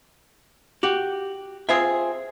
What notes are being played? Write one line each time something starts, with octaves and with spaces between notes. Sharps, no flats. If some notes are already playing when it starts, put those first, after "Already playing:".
F#4 G4
C4 F4 G#4 E5